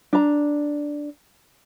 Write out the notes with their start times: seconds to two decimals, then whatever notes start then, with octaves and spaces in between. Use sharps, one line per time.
0.13 D4 A#5